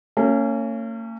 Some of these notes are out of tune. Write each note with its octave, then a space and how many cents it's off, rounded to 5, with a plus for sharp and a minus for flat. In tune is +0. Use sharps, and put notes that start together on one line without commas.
A#3 -45 C#4 +0